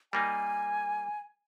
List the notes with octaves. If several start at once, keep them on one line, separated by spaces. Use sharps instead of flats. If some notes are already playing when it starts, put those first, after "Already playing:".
G3 A#3 D#4 G#5